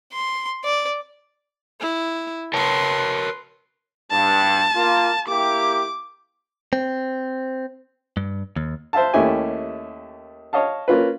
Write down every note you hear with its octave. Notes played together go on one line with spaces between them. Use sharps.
C6
D5
E4
A#4 B4 C#5 A5 C6
G2 A5
A#3 F4
A#3 E4 G4 D6
C4
G2
D#2
C5 E5 F5 A5
D#2 A3 C#4 E4 G4 G#5
C#5 D#5 F5 A5
A#3 C#4 F4 B4